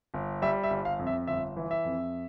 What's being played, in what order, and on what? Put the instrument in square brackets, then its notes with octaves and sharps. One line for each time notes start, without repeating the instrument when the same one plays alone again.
[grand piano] G1
G3 E5
E5
G1
F5
F2
E5
G1 E5
E3
E5
F2